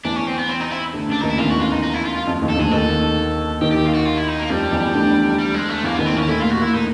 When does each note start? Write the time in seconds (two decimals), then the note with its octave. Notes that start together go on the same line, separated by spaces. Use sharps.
0.05 E2 E3 D4
0.16 C#4
0.27 C4
0.38 B3
0.49 C4
0.60 D#4
0.71 E4
0.94 D2 D3
1.08 C#2 C#3 D4
1.20 D#2 D#3 D#4
1.29 E4
1.38 E2 E3 F4
1.50 F#4
1.60 F4
1.72 D#4
1.83 D#4
1.94 E4
2.05 F4
2.16 F4
2.27 F2 F3
2.42 D#2 D#3
2.50 A4
2.57 D2 D3 G#4
2.71 D#2 D#3 A4
3.61 D#2 D#3 G4
3.71 G4
3.86 F4
3.95 F#4
4.05 F4
4.17 E4
4.28 D#4
4.40 A#3
4.50 F2 F3 G3
4.72 E2 E3
4.94 D2 D3
5.39 G3
5.54 G#3
5.69 A3
5.83 E2 E3 A#3
5.95 D#2 D#3 B3
6.06 C4
6.14 E2 E3 C#4
6.28 A2 A3 E4
6.40 A#2 A#3 F4
6.50 F#4
6.58 A#2 A#3 E4
6.73 A#2 A#3 D#4